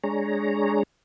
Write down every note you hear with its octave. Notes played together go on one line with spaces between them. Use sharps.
G#3 D4 G#4 C#5 A#5